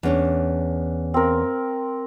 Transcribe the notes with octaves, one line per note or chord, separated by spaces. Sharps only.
E2 C#4 D4
C4 A#4